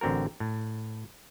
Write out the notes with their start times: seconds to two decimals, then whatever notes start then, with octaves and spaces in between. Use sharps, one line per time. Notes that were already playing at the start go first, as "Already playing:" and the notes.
0.01 A1 D3 C4 F#4 A#4
0.40 A2